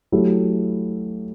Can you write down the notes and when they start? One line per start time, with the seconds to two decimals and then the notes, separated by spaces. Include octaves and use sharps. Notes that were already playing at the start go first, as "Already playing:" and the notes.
0.12 F#3 A3 E4 G4